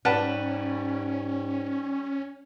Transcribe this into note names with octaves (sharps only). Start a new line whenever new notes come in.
G#2 G3 C#4 B4 F#5 A5